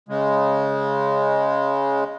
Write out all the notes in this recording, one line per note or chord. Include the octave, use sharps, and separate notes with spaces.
C#3 G#3